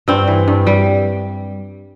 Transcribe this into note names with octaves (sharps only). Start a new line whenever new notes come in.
G2 C4
E3
G2
G3